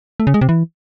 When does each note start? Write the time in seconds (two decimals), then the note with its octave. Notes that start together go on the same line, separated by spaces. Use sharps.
0.20 A3
0.27 C#3
0.34 G#3
0.41 C3
0.49 E3